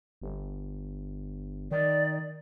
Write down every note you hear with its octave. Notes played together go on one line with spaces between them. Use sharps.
G1
D#3 D5